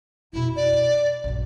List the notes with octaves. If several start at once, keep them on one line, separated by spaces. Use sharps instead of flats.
F2 B2 E4
D5
A#3
A#1 F#2